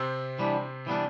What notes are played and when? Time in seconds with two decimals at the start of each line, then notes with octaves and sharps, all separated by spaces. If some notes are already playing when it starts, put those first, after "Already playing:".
Already playing: C3 C4
0.39 E3 G3 B3 D4
0.86 E3 G3 B3 D4